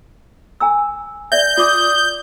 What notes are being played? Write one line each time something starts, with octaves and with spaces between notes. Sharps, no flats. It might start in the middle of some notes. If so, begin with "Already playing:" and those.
G#5 A#5 E6
D5 E5 G6
F4 D5 D6 D#6